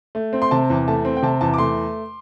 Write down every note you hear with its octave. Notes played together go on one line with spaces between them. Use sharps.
A3
C4
C6
C3 A5
E2
A3 A5
C4
G5
C3 A5
E2 A5
D6
A3 C6